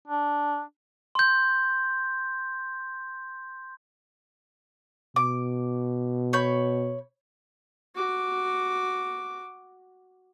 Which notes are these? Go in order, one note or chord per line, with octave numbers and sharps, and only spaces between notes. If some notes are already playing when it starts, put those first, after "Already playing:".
D4
C6 G6
B2 D6
C#5 B5 G6
F#4 D6